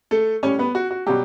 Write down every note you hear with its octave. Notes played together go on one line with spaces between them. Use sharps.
A3 A4
A2 G3 C#4 C#5
B3 B4
F#4
F#4
B2 F#3 G3 G4